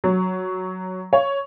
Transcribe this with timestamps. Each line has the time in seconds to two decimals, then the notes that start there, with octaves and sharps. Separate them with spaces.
0.04 F#3
1.13 C#5